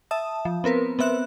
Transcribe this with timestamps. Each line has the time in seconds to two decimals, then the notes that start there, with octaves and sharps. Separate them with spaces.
0.11 E5 A5 D#6
0.45 F3
0.64 B3 C4 A#4 B4
0.99 B3 C4 E5 F#6